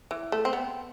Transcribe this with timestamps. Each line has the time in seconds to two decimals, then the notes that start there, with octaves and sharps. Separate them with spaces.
0.11 E3
0.32 A3
0.45 C4
0.53 B3